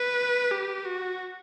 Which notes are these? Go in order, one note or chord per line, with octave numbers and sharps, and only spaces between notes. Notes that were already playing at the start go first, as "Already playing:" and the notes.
Already playing: B4
G4
F#4